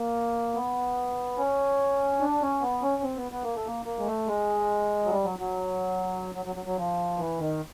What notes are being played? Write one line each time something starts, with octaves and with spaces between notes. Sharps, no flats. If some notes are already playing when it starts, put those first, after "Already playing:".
Already playing: A#3
B3
C#4
D4
C#4
B3
C#4
C4
B3
B3
A#3
A3
A#3
A#3
G#3
A3
G#3
F#3
G3
F#3
F#3
F#3
F#3
F#3
F#3
F3
E3
D#3